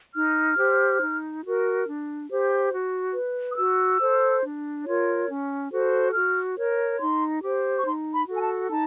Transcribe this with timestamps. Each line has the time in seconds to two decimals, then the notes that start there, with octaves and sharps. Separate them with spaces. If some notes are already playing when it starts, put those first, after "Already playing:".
0.15 D#4 F6
0.58 G4 C5
1.01 D#4
1.43 F#4 A#4
1.86 D4
2.29 G4 C5
2.71 F#4
3.14 B4
3.50 D#6
3.57 F#4 E6
4.00 A4 C5
4.43 D4
4.86 F4 A#4 C#5
5.28 C#4
5.71 F#4 A4 C5
6.14 F#4 F6
6.57 A#4 C#5
6.99 D#4 C6
7.42 G4 C5
7.79 C#6
7.85 D#4 C6
8.13 B5
8.27 F#4 A4
8.37 G#5
8.42 A5
8.70 D#4 A5